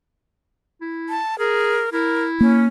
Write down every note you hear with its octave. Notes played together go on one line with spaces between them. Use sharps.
E4
A5
G#4 A#4
E4 A#4
A#3 C#4